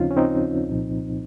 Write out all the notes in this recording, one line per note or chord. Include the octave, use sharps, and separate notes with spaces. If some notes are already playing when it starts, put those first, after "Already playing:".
Already playing: D#2 C#3 F3 C4 C#4 D#4 F4
C#4
C4 D#4
C2 A#2 F3